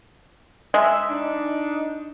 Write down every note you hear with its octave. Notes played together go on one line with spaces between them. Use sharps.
G#3 E5
D4 D#4 D#5